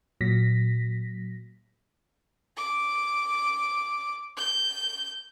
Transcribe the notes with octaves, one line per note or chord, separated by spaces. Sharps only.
A#2 F#3 A#6 B6
D6
G6